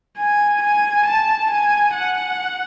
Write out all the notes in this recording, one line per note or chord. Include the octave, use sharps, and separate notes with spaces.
G#5
G#5
A5
G#5
F#5